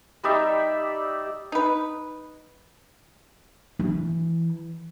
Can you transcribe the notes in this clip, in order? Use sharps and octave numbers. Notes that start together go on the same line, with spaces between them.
G3 D#4 D5 E5
D#4 B4
E3